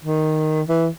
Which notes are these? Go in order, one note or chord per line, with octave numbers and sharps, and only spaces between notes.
D#3
E3